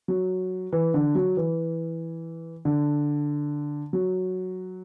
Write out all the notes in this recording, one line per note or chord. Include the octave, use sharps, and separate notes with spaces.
F#3
E3
D3
F#3
E3
D3
F#3